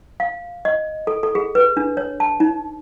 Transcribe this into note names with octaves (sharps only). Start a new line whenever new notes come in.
F5
D#5
A4
A4
G#4
B4
D4
C#5
A5
D#4